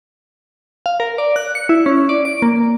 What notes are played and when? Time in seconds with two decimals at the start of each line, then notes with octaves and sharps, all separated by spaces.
0.86 F5
1.00 A#4
1.18 D5
1.36 F#6
1.55 C#7
1.69 E4
1.86 C#4
2.09 D5
2.25 D7
2.42 A#3